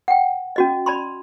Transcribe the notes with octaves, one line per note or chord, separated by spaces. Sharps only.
F#5 G5
C#4 F#4 D#5
D5 A5 B5 C6